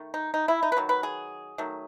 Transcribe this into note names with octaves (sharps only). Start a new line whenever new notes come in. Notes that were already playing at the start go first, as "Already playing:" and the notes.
Already playing: D#3 A3
D#4
D#4
E4
D#4
B4
D#3 F#3
B4
G#4
D#3 F#3 A3